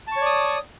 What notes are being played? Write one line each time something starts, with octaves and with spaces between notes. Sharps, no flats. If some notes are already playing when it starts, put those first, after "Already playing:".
C#5 D5 A5 C#6 D#6